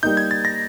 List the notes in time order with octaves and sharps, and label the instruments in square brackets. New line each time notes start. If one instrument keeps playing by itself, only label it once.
[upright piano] G3 A#3 D#4 [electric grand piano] G6
[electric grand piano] G#6
A6
A#6